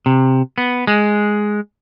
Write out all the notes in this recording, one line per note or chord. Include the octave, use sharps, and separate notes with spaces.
C3
B3
G#3